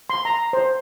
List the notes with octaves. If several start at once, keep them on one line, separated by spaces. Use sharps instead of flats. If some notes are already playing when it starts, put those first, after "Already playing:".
C6
A#5
C5